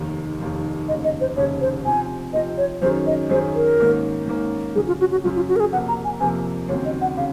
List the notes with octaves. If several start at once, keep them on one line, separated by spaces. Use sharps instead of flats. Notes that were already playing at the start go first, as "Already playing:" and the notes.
Already playing: F1 D#2 D#3
F1 D#2 D#3
F1 D#2 C#3 D#5
D#5
C5
F1 D#2 C#3 C#5
C5
C3 F3 C4 G#5
C3 F3 C4 D#5
C#5
F#2 D#3 F#3 C#4 G#4 C5
D#5
F#2 D#3 F#3 C#4 G#4 C5
A#4
G#2 D#3 A#3 C#4
G#2 D#3 A#3 C#4
F#2 C#3 F#3 G#4
F4
F#4
F#4
F#2 C#3 F#3 F4
F4
F#4
A#4
G#4
F2 C3 F3 A#3 F#5
A#5
G#5
F2 C3 F3 A#3 G#5
D#2 C#3 F#3 C4 C#5
D#5
F#5
C#3 F5